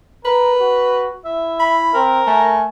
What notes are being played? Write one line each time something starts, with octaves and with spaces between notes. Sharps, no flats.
A#4 B4
F#4
E4 E5
B5
C4 A#4
A3 G#5